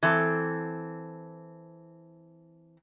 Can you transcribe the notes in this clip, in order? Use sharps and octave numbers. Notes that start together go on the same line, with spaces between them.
E3 C4 A4